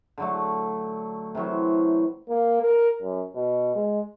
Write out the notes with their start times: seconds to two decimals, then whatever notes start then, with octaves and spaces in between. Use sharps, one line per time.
0.18 D3 F#3 A3
1.35 C3 E3 F#3
2.28 A#3
2.61 A#4
3.02 F#2
3.35 B2
3.75 G#3